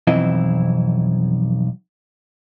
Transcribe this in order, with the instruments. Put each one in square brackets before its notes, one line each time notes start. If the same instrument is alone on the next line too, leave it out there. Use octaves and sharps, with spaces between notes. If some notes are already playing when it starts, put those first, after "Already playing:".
[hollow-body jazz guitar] B1 F2 E3 C4 E4 D#5